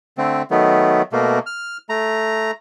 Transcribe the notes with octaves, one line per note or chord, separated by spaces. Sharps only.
D3 A3 C4
D#3 F#3 A3 B3
B2 A3 A#3
F6
A3 A#5